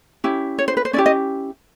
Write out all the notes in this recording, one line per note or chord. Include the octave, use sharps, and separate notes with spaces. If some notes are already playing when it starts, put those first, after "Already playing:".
C#4 E4 G4
C#5
C5
B4
C5
C#4 E4 G4 D5
D#5